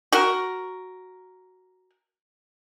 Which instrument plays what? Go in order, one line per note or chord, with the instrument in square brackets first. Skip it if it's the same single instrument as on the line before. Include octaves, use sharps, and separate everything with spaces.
[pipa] F#4 A#4